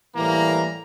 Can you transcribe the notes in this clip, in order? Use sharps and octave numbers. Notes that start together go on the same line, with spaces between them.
A2 E3 G3 A#3 A#5